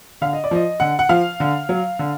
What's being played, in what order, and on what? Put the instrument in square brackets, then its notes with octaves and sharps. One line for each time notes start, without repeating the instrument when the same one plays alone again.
[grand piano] D3 F5
D#5
D5
F3 D#5
D3 F#5
F#5
F3 F5
D3
F#3
D3